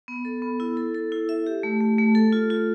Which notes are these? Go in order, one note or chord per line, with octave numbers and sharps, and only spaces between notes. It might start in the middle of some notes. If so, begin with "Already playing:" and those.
B3
A4
B3
E4
A4
A4
E4
E5
G4
A3
A3
A3
A4
F4
F4